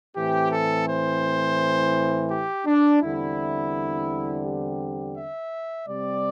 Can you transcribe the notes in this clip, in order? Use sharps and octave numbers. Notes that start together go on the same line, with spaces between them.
A2 E3 C4 G4
A4
C5
G4
D4
E2 D3 G3 C4 E4
G4
E5
C3 G3 C4 D5